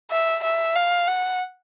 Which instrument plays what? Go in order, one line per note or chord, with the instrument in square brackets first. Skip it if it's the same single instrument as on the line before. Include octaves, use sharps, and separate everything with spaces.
[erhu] E5
E5
F5
F#5